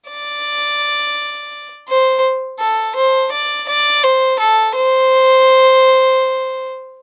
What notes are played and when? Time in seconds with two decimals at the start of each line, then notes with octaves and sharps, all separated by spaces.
0.09 D5
1.89 C5
2.60 A4
2.96 C5
3.32 D5
3.69 D5
4.04 C5
4.40 A4
4.75 C5